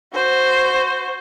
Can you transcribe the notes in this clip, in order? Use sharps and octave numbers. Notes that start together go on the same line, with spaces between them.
F#4 C5